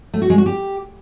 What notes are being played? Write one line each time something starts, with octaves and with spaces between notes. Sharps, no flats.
A3
F#4
G#3
F#4
G4